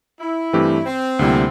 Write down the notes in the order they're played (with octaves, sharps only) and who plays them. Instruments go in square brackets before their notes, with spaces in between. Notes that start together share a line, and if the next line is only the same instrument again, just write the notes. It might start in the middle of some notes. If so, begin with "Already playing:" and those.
[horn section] E4
[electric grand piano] G2 E3 A3 C4 G4
[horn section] C4
[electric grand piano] D2 C3 G3 A#3 E4